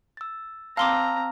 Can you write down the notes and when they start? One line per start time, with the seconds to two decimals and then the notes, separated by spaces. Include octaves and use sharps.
0.17 E6 A6
0.77 C4 F5 A5 A#5 C6 D6 E6 F6